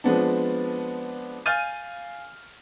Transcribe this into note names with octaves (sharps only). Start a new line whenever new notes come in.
F3 G#3 B3 C4 D4
F5 G#5 F6 G6 A6 D#7